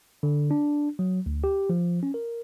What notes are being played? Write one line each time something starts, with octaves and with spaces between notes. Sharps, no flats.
D3
D4
F#3
D2
G4
F3
C#4
A#4